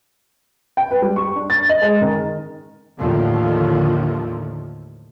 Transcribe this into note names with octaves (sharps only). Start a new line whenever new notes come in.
G5
B4
G3
C#6
D4
A6
D#5
G#3
D#3
D#2 A2 D3 D#3 F3